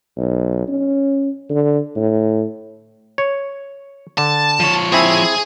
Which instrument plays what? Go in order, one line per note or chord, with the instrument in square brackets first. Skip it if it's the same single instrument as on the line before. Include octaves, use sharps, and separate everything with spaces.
[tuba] B1
C#4
D3
A2
[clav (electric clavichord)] C#5
[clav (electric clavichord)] D3 [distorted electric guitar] A5
[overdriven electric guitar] F3 C#5
[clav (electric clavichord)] C4 E4 [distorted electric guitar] G#4